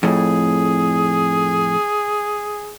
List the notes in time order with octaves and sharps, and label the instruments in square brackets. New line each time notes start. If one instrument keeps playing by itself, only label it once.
[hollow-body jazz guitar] F2 A2 [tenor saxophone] G#4